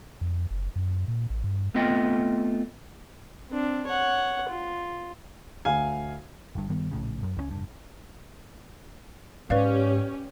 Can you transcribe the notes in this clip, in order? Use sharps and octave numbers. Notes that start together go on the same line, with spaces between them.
F2
F#1
F#2
A#2
A1
G2
A3 B3 C4 F4 D#5 G5
C4 D4
C#5 F#5
F4
D2 F5 G#5
G1 G2
G2 D#3 G3 B3
A#1 A2 C#3
F#2
C#2 D#3 C#4
F1 G2
G#2 C#4 G4 B4 D5 F5